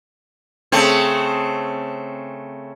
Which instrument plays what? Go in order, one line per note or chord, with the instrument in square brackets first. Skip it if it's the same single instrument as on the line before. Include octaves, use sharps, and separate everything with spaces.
[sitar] C#3 A3 C4